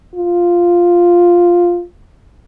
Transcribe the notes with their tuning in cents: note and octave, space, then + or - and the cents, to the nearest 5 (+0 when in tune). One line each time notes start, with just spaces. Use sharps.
F4 +0